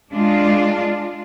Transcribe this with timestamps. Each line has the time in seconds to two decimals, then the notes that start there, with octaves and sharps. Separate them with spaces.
0.11 G#3 D4 F4